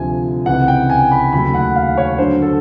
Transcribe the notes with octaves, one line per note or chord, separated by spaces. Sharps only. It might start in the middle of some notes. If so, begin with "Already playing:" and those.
Already playing: D2 C3 F3 G#5
C#2 C3 E3 F#5
G5
G#5
B5
D#2 C#3 F#3 A3 B5
F#5
F5
C#5
G2 D3 F#3 C5
A4